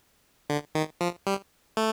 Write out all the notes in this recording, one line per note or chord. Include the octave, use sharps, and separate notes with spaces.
D3
D#3
F3
G3
A3